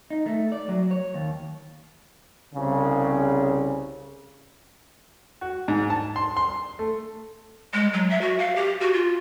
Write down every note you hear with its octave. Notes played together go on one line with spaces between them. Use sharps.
D#4
A3
D5
F#3
C#5
D#2
C2 C#3
F#4
G#2
A5
C6
C6
A3
G#3
F#3
E5
F#4
F5
G4
F#4
F4